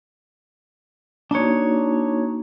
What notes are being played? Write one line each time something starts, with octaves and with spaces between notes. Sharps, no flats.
A#3 D4 D#4 F#4 C#5